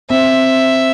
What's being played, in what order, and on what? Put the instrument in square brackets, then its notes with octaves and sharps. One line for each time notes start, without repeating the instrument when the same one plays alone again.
[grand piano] C4 [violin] E5